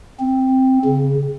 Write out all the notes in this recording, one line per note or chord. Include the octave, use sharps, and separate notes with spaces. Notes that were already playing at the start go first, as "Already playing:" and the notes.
C4
C#3